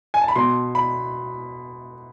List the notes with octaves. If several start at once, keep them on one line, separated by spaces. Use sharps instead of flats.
G#5
A5
B5
B2 C6
B5